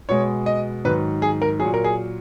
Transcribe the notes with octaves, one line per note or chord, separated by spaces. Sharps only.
B2 G#3 C#5
D#5
G#2 D#3 F#3 B4
G#4
A#4
F#3 G#4
A#2
A#4
G#4